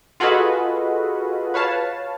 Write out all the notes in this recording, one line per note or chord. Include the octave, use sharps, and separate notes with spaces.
F4 F#4 G#4 A4 B4 D#5
B4 C#5 F5 A5